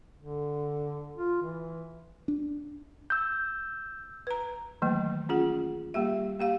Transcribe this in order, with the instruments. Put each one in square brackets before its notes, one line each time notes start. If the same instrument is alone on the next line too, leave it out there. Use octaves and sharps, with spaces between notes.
[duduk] D3
F4
E3
[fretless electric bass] D4
[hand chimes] E6 G6
[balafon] B4 A#5
D#3 E3 F#3 A3 A#3
C#4 F4 G#4 F#5
G3 A#3 G4 E5
A#3 G4 F5